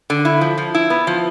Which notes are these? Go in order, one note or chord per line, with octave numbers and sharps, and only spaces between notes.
D3
E4
F3
F3
E4
B3
F3